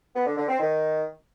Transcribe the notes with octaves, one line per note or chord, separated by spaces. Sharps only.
B3
D3
D3
C4
D#3